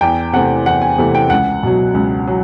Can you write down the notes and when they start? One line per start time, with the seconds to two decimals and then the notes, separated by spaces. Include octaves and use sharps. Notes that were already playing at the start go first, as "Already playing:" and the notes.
0.01 E2 G5
0.33 C3 E3 A3 C4 F#5
0.66 E2 F#5
0.82 G#5
0.98 C3 E3 A3 C4
1.15 G5
1.30 C#2 F#5
1.63 B2 F#3
1.94 C#2
2.27 F#3